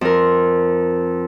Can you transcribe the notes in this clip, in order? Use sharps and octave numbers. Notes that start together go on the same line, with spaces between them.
F2 A#4